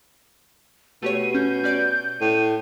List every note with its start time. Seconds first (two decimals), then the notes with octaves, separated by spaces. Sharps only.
1.03 B2 A3 G4 C#5 D#7
1.35 C#4 G6
1.64 C#4 D5 D7
2.21 A2 D#7